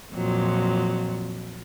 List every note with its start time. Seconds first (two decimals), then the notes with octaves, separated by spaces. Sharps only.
0.15 F2 A#2 F#3